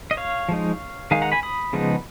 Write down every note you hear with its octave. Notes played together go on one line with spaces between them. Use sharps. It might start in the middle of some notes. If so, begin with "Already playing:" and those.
D#5
C#5 F5
F3 G#3 D#4
D#3 G#3 D#4 F5 G#5
F#5 A#5
G#5 B5
B5 D#6
C#3 F3 G#3 B3 D#4